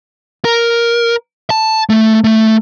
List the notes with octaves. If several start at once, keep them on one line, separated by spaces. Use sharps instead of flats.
A#4
A5
A3
A3